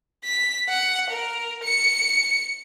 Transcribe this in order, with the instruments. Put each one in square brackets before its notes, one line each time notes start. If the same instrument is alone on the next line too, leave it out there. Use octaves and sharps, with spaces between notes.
[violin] B6
F#5
A#4
C#7